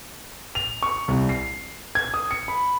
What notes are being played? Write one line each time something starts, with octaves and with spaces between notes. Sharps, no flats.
F7
C#6
C2
C7
G#6
D#6
C#7
B5